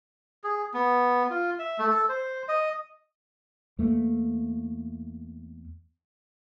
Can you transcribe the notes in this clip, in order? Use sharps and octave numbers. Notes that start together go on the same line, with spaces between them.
G#4
B3
F4
E5
A3
A4
C5
D#5
E2 A3 A#3